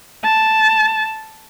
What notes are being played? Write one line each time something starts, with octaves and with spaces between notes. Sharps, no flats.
A5